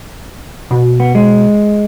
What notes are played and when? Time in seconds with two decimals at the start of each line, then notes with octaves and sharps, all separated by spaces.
0.71 B2
1.00 B3
1.15 G#3